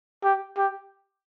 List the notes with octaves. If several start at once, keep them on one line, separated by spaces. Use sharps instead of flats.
G4
G4